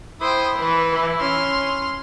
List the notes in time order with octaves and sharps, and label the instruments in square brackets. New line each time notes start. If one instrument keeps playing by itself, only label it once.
[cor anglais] E4 [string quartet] C5 [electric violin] G5 D#6
[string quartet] E3 [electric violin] B4
[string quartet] C#4 [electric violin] C6 F6